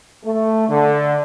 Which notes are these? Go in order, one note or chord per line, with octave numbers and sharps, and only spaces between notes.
A3
D3